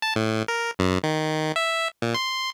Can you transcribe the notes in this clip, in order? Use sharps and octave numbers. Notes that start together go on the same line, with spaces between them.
A5
A2
A#4
F#2
D#3
E5
A#2
C6